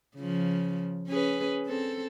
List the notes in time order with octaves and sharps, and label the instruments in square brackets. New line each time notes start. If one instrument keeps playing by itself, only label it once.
[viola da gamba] C#3 F3
C#4 G#4 B4
C4 A4